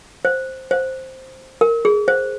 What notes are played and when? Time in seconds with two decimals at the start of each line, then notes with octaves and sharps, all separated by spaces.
0.25 C5
0.71 C5
1.61 A#4
1.85 G#4
2.08 C5